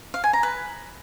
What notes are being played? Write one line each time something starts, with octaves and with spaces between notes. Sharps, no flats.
F5
G#5
A#5
B4